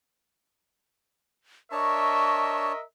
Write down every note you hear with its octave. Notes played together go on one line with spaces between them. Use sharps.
D4 A#4 C#5 D#5 E5 A5 C#6